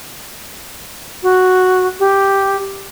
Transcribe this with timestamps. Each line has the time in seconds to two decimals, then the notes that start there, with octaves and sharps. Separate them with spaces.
1.23 F#4
2.00 G4